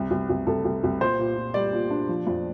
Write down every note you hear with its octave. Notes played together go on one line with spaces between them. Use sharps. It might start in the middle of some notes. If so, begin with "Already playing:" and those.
Already playing: C2
C2
C2
C2 A4
C2
C2
A#2 C5
A#2
A#2
G3 D5
A#2
D4
F3
F2